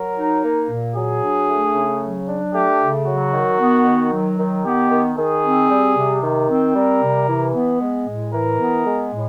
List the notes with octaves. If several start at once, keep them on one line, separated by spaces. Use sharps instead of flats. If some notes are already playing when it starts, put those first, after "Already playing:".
Already playing: F#3 A#4
D#4
A#3
A#2
F#3 G#4
D4
A3
C#3
F#3
D4
A3 G4
C#3
F#3 F#4
D#3
B3
D#3
F#3
D#3
B3 G4
D#3
D#3 G#4
C4
G3
C3
D#3
C4
G3 A#4
C3
E3
B3
G#3
A2
E3 A#4
B3
G#3
A2